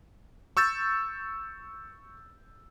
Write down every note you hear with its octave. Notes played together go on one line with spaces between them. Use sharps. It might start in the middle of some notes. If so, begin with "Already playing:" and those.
C#6 E6 G6 A6